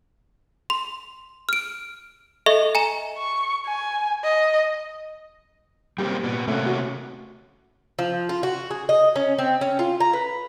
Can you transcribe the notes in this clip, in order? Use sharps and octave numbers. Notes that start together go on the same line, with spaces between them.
C6
F6 D7
A4 D#5 E5 C#6
G#5 A#5 E7
C#6
G#5
D#5
G3 A#3 C4 G4 G5
A#2 B3
C3 A3 A#3 C#4 F#5
F#4
F3
F4
F#4
G#4
D#5
C#4
C4
C#4
F4
A#5
B4